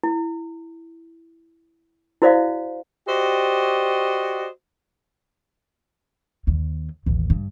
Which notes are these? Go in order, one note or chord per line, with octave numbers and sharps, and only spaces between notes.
E4
E4 F#4 C5 D5 E5 F5
F#4 G4 C5 D5 D#5
D#2
A1 D#2
G2